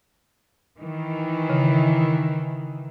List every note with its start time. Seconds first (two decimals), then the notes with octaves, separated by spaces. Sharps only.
0.79 D#3 E3
1.50 C#3